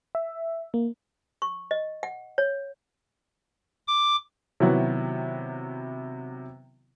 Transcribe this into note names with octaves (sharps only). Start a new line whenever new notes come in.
E5
A#3
C#6
D#5
F#5
C#5
D6
C3 D#3 F#3 B3 E4 F#4